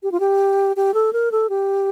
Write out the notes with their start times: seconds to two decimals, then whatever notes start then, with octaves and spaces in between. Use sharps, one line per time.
0.03 G4
0.12 F4
0.20 G4
0.76 G4
0.94 A4
1.13 A#4
1.32 A4
1.49 G4